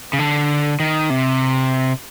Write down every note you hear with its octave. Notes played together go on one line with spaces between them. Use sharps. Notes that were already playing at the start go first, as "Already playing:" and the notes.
C#3
D3
D#3
C3